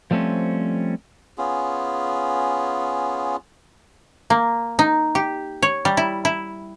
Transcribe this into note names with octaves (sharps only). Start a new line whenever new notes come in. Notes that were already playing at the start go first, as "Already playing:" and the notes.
F3 G3 A3 C4 C#4
B3 C#4 F4 G#4
A#3
D#4
G4
C#5
G3
E4
E4